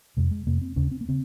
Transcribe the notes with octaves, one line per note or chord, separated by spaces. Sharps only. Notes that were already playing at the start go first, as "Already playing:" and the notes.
F2 C3 G#3
G#3
F2 C3 A#3
C4
D#2 C#3 C#4
C4
A#3
C#3 C4